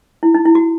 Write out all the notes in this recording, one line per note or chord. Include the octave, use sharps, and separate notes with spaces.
E4
D#4
E4
F#4